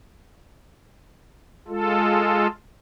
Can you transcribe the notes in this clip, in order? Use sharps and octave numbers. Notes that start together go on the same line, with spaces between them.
G#3 F4 A4